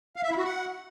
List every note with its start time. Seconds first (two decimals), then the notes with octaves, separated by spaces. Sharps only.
0.16 F5
0.23 E5
0.30 E4
0.37 F#4
0.44 F#5